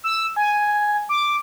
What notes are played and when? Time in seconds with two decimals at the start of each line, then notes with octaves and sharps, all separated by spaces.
0.04 E6
0.36 G#5
1.09 D6